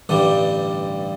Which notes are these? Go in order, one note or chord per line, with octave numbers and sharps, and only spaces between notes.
A1 G2 D3 G3